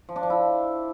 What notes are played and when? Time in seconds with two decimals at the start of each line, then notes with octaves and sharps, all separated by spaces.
0.09 F3
0.16 D4
0.23 F3
0.30 E4